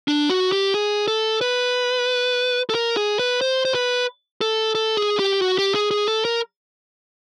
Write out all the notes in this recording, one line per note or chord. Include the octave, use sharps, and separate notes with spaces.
D4
F#4
G4
G#4
A4
B4
A4
A#4
G#4
B4
C5
C5
B4
A4
A4
G#4
G4
F#4
G4
G#4
G#4
A4
A#4